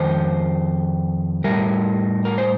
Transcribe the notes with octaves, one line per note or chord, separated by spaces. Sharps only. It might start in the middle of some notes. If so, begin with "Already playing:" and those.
Already playing: F2 D#3 C5
A2 G3 A#4
A#4
C5